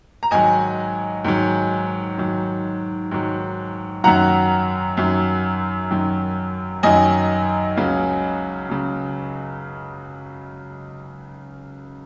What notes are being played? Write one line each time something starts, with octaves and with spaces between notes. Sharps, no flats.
A#5
G#2 D#3 F#3 D#5 G#5
G#2 D#3 F#3
G#2 D#3 F#3
G#2 D#3 F#3
F#2 D#3 F#3 F#5 A#5
F#2 D#3 F#3
F#2 D#3 F#3
F#2 D#3 F#3 D#5 G#5
C#2 C#3 F#3
C#3 F#3